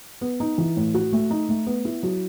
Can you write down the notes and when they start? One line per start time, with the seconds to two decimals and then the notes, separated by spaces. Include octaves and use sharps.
0.21 B3
0.40 D#4
0.58 E3
0.77 A2
0.94 F#4
1.13 A3
1.30 D#4
1.49 A3
1.67 B3
1.85 E4
2.03 F#3